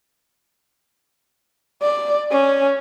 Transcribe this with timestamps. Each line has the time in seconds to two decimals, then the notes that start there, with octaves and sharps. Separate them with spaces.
1.82 D5
2.31 C#4